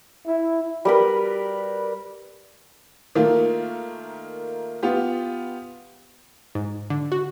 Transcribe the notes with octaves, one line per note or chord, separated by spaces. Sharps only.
E4
G3 A#4 B4
D#3 A3 A#3 F4
B3 F4 G4
G#2
D3
F#4